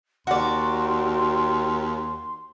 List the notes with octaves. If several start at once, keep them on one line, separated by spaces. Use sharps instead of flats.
D#2 F#4 D5 C6